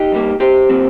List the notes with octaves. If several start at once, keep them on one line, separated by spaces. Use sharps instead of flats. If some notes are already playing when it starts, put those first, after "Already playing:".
Already playing: D#4 G4
G2 G3 A#3
G4 C5
A#2 F3 C4